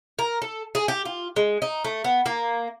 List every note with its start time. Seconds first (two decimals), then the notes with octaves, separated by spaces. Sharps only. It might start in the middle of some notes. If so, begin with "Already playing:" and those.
0.19 A#4
0.42 A4
0.75 G#4
0.88 G4
1.05 F4
1.36 G#3
1.62 D#4
1.85 A3
2.04 B3
2.26 A#3